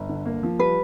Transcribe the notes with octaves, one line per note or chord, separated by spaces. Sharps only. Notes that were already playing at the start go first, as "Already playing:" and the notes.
Already playing: G1
D3
A#3
F3
G3 B4